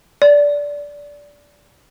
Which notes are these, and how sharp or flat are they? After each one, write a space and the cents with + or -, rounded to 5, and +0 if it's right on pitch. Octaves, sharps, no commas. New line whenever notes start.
D5 -15